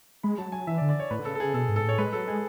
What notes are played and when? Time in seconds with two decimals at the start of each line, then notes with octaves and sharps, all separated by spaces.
0.23 G#3 B5
0.38 F#3 A5
0.52 F#3 G#5
0.67 E3 E5
0.78 D5
0.81 D3
0.89 D5
0.99 C#5
1.11 A2 B4
1.19 D3
1.25 C#3 A4
1.35 A4
1.40 C#3 G#4
1.54 B2 A4
1.69 G#2
1.76 A4
1.84 A2 C#5
1.98 G#3 B4
2.13 F#3 A4
2.27 G#3 G#4